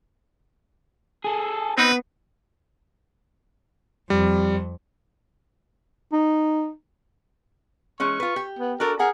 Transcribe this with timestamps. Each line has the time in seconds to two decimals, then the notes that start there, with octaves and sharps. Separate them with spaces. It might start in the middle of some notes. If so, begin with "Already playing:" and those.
1.24 G#4 A4
1.78 B3 C4 D#4 B4
4.10 F2 G3
6.13 D#4
8.00 E3 G#3 C#4 C#6
8.20 F4 B4
8.36 G4
8.59 B3
8.80 D4 F#4 A4 A#4
8.99 G#4 A#4 F#5 A#5